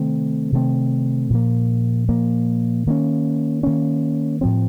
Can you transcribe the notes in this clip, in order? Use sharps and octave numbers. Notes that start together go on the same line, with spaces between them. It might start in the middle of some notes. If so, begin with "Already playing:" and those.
Already playing: C3 D#3 A3 C4
C3 D#3 A3 C4
A#2 F3 A#3
A#2 F3 A#3
D#3 A#3 C#4
D#3 A#3 C#4
A2 F3 C4